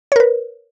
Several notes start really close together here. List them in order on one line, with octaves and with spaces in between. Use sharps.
C#5 A#4 B4